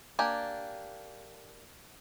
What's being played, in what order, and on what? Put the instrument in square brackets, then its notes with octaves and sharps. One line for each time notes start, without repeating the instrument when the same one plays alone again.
[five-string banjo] A#3 D4 G4 G#5